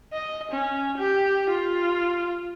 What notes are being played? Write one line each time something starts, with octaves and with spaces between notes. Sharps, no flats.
D#5
C#4
G4
F4